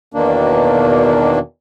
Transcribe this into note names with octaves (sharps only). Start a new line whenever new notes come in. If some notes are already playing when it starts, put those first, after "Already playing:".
E2 B2 D#3 A#3 D4